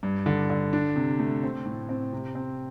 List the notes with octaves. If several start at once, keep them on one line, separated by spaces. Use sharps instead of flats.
G2
D3
D3
D4
C3
A3
C4
A2
C4
C3
C4